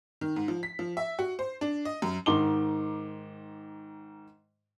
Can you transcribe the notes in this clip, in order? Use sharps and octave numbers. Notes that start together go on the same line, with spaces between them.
D#3
G#2
F3
B6
F3
E5
F#4
C5
D4
D#5
F#2
G#2 D#3 D#4 C6 D6 G7